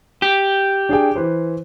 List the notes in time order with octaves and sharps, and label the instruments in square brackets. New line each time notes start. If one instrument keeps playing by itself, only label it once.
[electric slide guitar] G4
[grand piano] D4 G#4 G5
E3 B4 C5